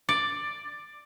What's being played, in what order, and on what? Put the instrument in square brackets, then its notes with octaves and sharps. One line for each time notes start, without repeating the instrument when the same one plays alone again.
[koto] D5